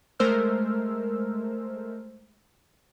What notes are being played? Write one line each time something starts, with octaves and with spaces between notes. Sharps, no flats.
G#3 A3 A#4 C5 E6 F6